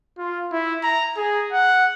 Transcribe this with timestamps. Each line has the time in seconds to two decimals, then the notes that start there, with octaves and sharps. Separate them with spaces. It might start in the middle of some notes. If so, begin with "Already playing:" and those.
0.18 F4
0.52 E4
0.83 A#5
1.17 G#4
1.53 F#5